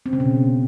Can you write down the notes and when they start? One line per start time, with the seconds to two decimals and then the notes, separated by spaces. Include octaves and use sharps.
0.06 C4
0.13 C#3
0.20 B2